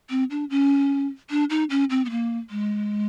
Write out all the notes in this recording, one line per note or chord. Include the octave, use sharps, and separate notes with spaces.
C4
D4
C#4
D4
D#4
C#4
C4
B3
A#3
G#3